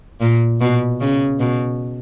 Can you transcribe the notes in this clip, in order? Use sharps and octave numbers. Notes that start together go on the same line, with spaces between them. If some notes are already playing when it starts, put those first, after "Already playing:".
A#2
B2
C#3
B2